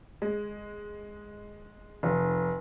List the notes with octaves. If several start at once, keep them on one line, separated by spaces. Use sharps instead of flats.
G#3
F1